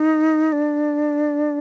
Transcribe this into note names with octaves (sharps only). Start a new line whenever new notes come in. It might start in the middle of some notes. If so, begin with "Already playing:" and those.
Already playing: D#4
D4